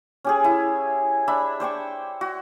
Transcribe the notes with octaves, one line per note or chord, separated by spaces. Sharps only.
C#4 G4 G#4
E4
D4 E5 B5
C5 D5 G5 C#6
F#4